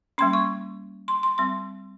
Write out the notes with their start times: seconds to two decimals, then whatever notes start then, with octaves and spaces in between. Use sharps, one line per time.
0.18 G3 A#3 C#4 C6
0.33 C#6
1.08 C6
1.23 C6
1.38 G3 C4 C6